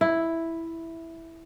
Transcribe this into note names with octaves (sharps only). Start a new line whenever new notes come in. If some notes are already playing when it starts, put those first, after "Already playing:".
E4